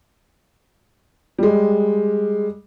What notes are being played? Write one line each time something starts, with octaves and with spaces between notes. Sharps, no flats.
G3 G#3